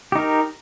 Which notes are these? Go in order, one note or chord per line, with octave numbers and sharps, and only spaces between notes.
D#4 G4 A#4